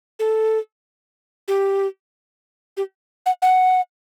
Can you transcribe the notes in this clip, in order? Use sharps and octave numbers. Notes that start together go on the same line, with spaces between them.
A4
G4
G4
F#5
F#5